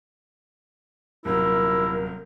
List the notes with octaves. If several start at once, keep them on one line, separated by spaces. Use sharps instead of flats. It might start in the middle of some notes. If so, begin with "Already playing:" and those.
D#1 C3 F#3 E4 A#4